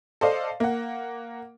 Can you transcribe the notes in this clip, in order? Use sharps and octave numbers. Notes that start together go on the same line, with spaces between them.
A4 C5 D5 D#5 F5
A#3 F#5